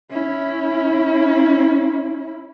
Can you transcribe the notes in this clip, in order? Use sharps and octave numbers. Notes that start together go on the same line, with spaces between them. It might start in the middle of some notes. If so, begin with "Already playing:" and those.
C#4 E4